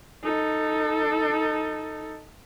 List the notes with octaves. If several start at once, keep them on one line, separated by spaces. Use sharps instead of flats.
D#4 A4